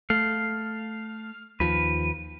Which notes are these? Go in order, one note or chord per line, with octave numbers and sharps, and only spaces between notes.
A3 F5
D#2 F3 B4